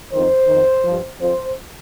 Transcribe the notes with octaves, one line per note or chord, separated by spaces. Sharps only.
F2 D#3 C5
F2 D#3
G2 F3
F2 F3 C5